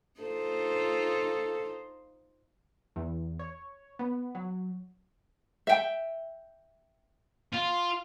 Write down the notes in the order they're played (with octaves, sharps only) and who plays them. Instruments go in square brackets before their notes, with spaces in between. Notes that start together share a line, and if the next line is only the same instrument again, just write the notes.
[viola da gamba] D#4 F4 C5 [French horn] A4
[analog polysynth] E2
C#5
B3
F#3
[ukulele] E5 G5
[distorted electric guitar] F4